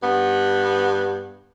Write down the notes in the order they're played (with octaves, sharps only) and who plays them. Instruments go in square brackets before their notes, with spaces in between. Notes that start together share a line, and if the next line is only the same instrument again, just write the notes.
[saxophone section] G2 B3